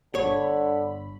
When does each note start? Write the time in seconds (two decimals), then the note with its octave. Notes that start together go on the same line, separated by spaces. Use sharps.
0.15 G1 D3 C#5 B5